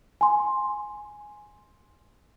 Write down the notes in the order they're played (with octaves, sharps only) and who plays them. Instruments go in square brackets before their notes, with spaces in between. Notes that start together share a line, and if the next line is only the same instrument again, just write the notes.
[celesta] G#5 C6